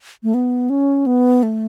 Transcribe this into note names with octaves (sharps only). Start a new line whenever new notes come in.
A3
B3
C#4
B3
A3